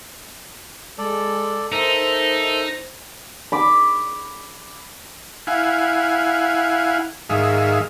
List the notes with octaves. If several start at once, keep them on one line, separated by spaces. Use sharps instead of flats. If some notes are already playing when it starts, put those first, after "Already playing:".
G#3 A4 D5
D#4 A4 A#4 C5 E5
B5 D6
E4 F5 F#5 G#5
G#2 D#3 G#4 E5 F5